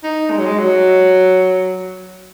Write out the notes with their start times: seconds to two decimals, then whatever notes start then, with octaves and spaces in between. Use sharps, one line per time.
0.04 D#4
0.31 G#3
0.38 F#3
0.46 G#3
0.58 F#3